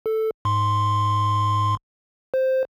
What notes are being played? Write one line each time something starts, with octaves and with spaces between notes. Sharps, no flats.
A4
G#2 C6
C5